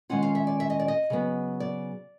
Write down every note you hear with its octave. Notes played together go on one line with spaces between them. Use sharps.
D#3 G#3 C#4 F4 F#5
F5
E5
D5
E5
D#5
D5
D#5
C#3 F#3 B3
D5